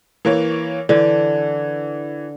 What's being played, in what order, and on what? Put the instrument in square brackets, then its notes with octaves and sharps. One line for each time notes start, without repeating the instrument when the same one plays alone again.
[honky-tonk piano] E3 A#3 C#5
[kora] D3 [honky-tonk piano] E3